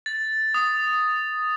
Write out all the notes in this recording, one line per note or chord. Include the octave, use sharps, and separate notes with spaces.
A6
D#6